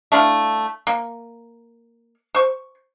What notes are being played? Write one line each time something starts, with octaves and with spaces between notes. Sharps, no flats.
A3 D4 E4 F5
A#3
C5 C#6